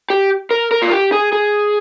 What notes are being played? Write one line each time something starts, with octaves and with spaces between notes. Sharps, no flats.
G4
A#4
A#4
F4
G4
G#4
G#4